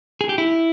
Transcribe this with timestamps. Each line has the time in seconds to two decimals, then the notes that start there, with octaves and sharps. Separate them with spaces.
0.21 G#4
0.29 G4
0.38 E4